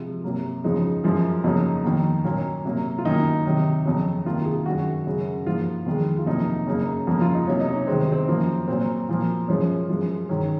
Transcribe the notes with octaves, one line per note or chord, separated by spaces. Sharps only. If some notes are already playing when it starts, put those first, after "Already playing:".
Already playing: C3 F3 G#3
C3 F#3 A#3
F2 C#3 F3 G#3 D#4
F#2 F3 G#3
F2 C#3 F#3 A#3 D#4
F2 D#3 A#3
A#2 F#3 A#3 C#4
C3 F#3 A#3
F4
F#2 D#3 A#3 D#4
C3 D#3 F#3
F2 C#3 F#3
C3 D#3 A#3 F4
G#4
F#2 D#3 G#3 F#4
F#2 C#3 G#3
G#2 F3 A#3 F4
F2 D#3 G#3
F4
F2 C3 F#3 A#3 D#4
F#2 C#3 F#3 A#3
F2 C#3 F3 A#3
F4
D#4
C3 F#3 A#3 C#4
D#4
C#4
C3 D#3 G#3 C4
C4
F#2 F3 A#3
A#2 F#3 A#3 C4
A#2 F3 A#3
F#2 F3 G#3 C#4
F#2 F3 G#3
G#2 D#3 F#3 C#4